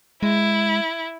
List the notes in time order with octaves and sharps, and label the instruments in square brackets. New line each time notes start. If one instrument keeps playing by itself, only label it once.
[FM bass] G#3 [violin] E4